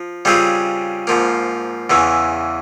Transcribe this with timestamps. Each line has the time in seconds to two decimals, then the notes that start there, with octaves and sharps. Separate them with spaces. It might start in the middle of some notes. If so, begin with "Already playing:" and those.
Already playing: F3
0.25 C#3 G3 C4 F4 G#4
1.07 G#2 F3 A#3
1.90 E2 C#3 E3